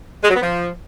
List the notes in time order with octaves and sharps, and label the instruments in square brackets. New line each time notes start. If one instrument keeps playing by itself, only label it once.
[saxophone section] G#3
F#3
B3
F3